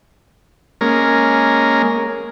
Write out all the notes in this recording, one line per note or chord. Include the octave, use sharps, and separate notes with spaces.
G#3 A#3 C#4 A#4